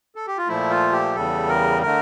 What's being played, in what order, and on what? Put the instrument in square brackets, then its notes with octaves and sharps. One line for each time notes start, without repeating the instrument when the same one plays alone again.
[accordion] A4
G4
F4
A#2 F3 A3 E4
F4
G4
E2 C#3 G3 A4
A#4
D3 A3 A#4